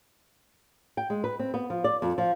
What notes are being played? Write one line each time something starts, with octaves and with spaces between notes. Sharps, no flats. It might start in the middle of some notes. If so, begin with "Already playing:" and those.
G5
G#3
B4
C4
B3
F3
D5
F2
F3